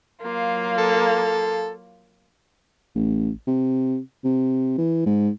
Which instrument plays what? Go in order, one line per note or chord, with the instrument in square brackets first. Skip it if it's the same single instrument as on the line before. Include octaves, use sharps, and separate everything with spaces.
[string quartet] F#3 A#3 F4
[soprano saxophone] A4
[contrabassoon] A1
C3
C3
E3
G#2